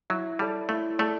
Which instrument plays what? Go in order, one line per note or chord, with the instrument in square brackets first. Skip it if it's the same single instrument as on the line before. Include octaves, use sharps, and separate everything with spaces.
[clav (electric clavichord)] F#3 [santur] E4
[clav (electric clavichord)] G3 [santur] A4 D5
[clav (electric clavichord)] A3 [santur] E4
[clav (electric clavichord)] A3 [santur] A4 D5